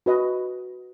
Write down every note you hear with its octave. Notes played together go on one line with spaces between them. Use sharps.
F#4 B4 D#5